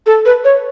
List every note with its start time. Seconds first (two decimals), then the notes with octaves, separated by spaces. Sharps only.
0.06 A4
0.26 B4
0.45 C#5